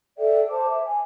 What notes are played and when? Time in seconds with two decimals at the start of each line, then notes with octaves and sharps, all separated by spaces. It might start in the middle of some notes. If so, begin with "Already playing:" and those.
0.18 A4 D5 E5 G5
0.51 C5 A5 D6
0.70 E5
0.86 G#5